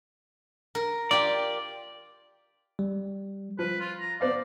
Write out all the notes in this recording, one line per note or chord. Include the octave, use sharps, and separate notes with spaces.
A#4
F4 G4 D5
G3
F3 B4
F4
A#5
B3 C5 D5 F5